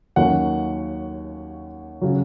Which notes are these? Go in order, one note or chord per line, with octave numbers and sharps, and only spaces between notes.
D#2 D#3 F#3 A#3 C#4 F#5
C#3 F#3